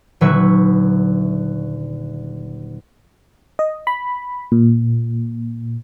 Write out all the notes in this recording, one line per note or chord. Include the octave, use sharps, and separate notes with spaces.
D#1 D3 F#3 B4 E5 C#6
D#5
B5
A#2